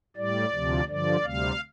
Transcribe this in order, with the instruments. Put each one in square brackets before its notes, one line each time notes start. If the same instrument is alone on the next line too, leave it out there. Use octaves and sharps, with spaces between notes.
[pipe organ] A2 G3 D5
D2 C3 F3
G2 D3 F3 D5
D2 C3 G3 F5